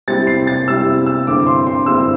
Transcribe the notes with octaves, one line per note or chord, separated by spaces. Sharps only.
C3 G3 C4 E4 A6
C7
A6
C3 G3 C4 E4 E6
E6
G2 D3 C4 E4 D6
C6
C6
G2 D3 C4 E4 E6